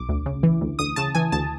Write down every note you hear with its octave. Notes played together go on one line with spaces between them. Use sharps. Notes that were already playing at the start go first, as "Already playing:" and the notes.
Already playing: B1 D6
D2
C#3
E3
D2
D2 D#6
C#3 A5
E3 G#5
D2 A5